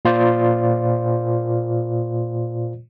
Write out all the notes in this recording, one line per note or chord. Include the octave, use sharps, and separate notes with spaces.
A#2 F4 C5 D5